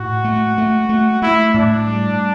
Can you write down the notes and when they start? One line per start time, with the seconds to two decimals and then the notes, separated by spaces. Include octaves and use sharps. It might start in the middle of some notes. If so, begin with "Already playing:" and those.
Already playing: A2 F#4
0.24 A3
0.58 A3
0.89 A3
1.22 A3 E4
1.54 A2 D4
1.87 G3